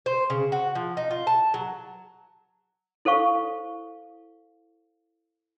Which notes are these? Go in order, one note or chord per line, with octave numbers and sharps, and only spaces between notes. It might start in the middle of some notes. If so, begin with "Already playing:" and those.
C5
C#3
F#4
F3
D#4
F4
A5
F#3
E4 A4 C5 F5 C#6